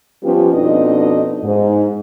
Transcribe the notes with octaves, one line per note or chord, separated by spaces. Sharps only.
F3 G3 B3 C#4 F4 G4
F2 B2 D4 D#4 D#5
G#2